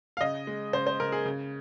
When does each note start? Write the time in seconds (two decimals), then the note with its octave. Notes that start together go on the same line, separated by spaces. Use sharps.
0.17 F5
0.21 C#3 D#5
0.47 G#3
0.73 C#3 C5
0.87 C5
1.00 C#3 A#4
1.12 G#4
1.25 C#3